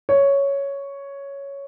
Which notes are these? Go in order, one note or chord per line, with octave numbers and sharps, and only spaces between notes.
C#5